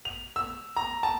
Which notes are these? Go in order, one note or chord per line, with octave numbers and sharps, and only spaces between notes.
F7
E6
A#5
A5